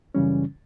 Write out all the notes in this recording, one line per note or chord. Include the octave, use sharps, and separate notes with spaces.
F#2 C#3 E3 G3 C#4